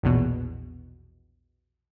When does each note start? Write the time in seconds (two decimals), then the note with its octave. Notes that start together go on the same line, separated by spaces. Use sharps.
0.03 A#1 E2 B2